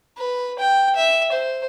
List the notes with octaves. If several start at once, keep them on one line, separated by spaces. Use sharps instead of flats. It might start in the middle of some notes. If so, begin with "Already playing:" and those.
B4
G5
E5
C5